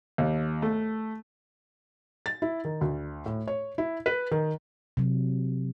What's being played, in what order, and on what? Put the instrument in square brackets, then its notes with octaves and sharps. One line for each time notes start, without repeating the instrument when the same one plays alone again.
[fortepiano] D#2
A3
[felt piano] A6
E4
D#3
D2
A2
C#5
E4
B4
D#3
[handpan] C3 F#3